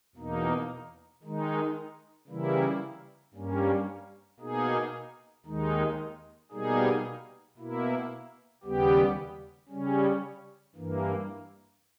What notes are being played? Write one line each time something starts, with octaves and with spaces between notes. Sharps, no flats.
E2 B2 A#3 D#4
D#3 G#3 D#4
C#3 E3 G3 A#3 E4
G2 G3 A#3 C#4
B2 A#3 D#4 G#4
D#2 D#3 G#3 D#4
B2 G3 A#3 D#4 G#4
B2 A#3 E4
D#2 C#3 G3 B3 G4
C#3 G3 C#4
G2 E3 A#3